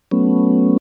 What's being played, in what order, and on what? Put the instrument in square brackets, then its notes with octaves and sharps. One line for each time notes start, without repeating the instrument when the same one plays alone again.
[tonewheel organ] F#3 A3 B3 C#4